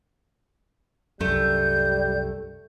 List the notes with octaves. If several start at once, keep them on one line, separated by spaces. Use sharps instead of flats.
C2 F#2 G3 A3 G6